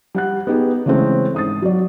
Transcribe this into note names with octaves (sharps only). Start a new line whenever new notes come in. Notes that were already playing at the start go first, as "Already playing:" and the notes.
G3 F#5 F#6
B3 D#4 G4 G#4
C#3 E3 G#3 A3 C4
G#1 D#6 A6
F#3 D5